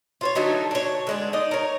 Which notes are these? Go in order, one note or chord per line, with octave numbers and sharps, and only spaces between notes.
F4 C5 C#5
D3 F#3 A3 D#4
D4 C#5
D3 G#3 D4
D#4 D5 D#5
A#4 C#5